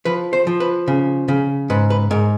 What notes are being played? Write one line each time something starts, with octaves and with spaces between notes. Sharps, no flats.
F3 B4
C5
F3
B4
C#3
C#3
G#2 B4
B4
G#2 A#4